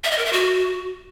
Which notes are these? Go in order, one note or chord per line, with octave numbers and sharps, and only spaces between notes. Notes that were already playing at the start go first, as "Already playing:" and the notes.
E5
D#5
A#4
E5
F#4